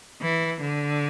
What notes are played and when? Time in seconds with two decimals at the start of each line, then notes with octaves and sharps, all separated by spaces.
0.22 E3
0.61 D3